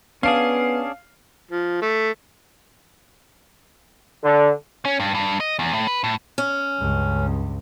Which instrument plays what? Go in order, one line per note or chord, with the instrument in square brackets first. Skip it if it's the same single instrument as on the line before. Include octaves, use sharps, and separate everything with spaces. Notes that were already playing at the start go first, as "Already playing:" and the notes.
[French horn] B3 [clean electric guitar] C#4 D4 G#4 [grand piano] F5
[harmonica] F3
A3
[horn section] D3
[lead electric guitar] C#4
G2
G2
D#5
E2
A2
B4
A2
[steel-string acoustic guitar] C#4
[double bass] C#2 G2